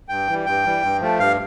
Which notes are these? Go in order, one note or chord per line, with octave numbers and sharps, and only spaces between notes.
G2 G5
E3 G3
G2 G5
E3 G3
G2
F3 A3
G2 F5